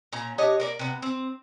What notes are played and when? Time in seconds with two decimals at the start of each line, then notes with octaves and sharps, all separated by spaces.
0.13 A#2 C#4 A#5
0.38 D4 G4 C#5 D#5
0.60 A#3 A#4 D5
0.79 C3 B3
1.02 C4